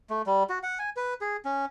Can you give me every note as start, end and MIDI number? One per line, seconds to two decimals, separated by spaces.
0.10 0.22 57
0.26 0.43 55
0.50 0.59 66
0.63 0.79 78
0.79 0.90 80
0.97 1.14 71
1.21 1.37 68
1.45 1.65 61